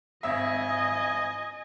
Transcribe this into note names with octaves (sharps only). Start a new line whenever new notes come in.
G#1 D#5 E5 G#5